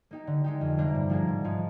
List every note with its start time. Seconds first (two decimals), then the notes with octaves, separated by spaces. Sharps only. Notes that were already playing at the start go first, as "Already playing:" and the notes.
0.11 A#3 D#4 G4
0.27 D3
0.44 G#3 D#4 G4
0.61 F2
0.78 C3 G3 A#3 D4
0.95 G2
1.10 F3 A#3 D4 G#4
1.28 G#2
1.44 F3 G#3 D#4